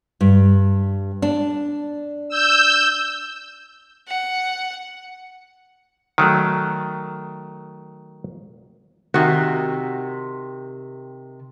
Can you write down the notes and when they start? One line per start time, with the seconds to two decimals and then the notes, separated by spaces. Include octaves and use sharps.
0.21 G2
1.22 D4
2.29 E6 G6
4.08 F#5
6.18 D#3 F#3 A3
9.14 C3 D#3 F#4